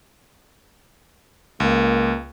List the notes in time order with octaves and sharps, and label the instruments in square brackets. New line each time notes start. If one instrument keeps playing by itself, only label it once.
[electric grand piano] C#2 [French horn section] A#3